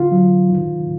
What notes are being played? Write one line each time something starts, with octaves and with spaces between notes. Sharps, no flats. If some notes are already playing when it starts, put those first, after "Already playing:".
Already playing: D3 F4
F#3
D#3